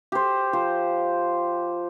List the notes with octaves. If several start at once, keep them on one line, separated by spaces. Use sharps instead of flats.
G4 C5
F3 C5